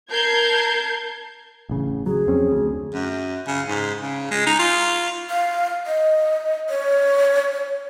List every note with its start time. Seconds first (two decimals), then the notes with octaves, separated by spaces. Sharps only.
0.11 A#4 A5 G6 G#6 C7
1.69 A1 C#3
2.06 F#3 G#4
2.27 F2 C4 C#4
2.51 D2
2.94 F#2
3.47 C#3
3.68 G#2
4.01 C#3
4.31 G#3
4.46 D#4
4.59 F4
5.30 F5
5.87 D#5
6.69 C#5